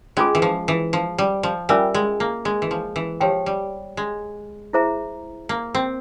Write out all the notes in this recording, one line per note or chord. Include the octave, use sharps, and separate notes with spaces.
G#3 C#4 F4 G#4
E3
F3
E3
F3
G3
F3
G3 C#4 F4 A#4 E5 G#5
G#3
A#3
G#3
E3
F3
E3
F3 G4 C#5 G5
G3
G#3
E4 G#4 C5 E5 A#5
A#3
C4